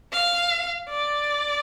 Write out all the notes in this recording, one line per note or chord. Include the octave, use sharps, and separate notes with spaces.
F5
D5